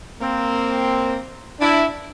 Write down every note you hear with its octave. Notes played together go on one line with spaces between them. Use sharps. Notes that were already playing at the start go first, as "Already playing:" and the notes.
A#3 C4
D4 E4